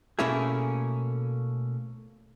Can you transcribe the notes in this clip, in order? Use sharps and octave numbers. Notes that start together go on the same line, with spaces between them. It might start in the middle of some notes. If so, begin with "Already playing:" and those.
B2 A3 A#3 C#4 E4 G#4